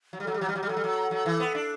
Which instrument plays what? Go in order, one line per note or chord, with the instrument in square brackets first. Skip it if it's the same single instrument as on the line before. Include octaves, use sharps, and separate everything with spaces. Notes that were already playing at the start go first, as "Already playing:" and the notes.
[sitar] F#3
G3
[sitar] F#3 [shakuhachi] A4
[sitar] G3
[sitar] F#3 [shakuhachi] G4
[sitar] G3
[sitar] F#3 [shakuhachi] G4
[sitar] G3
[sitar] F#3 [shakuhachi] A4
[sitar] G3
F#3
F#3
E3
B3
D4